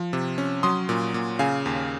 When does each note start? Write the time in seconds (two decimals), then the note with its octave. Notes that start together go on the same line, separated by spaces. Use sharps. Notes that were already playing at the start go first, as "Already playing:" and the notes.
Already playing: F3
0.13 C3
0.38 C#4
0.63 F#3 C6 D#6
0.89 A#2
1.14 A#2
1.39 C#3 F5 G#5
1.66 D#2